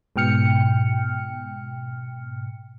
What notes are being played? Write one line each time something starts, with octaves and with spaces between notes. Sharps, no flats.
G#2 B2 G5 F6 C#7